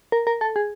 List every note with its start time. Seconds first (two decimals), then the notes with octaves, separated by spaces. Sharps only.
0.12 A#4
0.27 A#4
0.41 A4
0.56 G#4